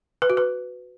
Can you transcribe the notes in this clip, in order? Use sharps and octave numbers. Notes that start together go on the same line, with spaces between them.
B4
F#4
B4